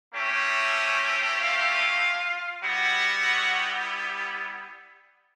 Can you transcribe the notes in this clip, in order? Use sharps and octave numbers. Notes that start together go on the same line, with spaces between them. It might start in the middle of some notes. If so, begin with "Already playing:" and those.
A3 C4 C#4 E4 G4 C#5
F4 F5
G3 B3 E4 F#4 G4 F#5